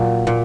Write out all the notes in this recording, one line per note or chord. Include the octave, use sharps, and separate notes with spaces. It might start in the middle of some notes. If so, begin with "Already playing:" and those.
Already playing: A#2 F#3
A#2